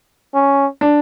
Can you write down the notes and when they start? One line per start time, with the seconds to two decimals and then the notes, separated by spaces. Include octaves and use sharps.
0.34 C#4
0.81 D4